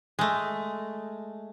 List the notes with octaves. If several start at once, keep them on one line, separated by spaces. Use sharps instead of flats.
G#3 A3